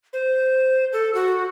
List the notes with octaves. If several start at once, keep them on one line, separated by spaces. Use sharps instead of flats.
C5
A4
F#4